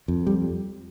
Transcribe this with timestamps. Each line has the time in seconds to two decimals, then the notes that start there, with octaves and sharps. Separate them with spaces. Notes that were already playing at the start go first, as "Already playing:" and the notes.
0.08 F2
0.27 G3